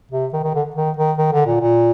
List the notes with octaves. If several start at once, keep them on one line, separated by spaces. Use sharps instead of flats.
C3
D#3
D#3
D3
D#3
D#3
D#3
D3
A#2
A#2